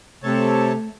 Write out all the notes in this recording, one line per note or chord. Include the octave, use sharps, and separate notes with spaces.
C3 A3 A4 C#5 A5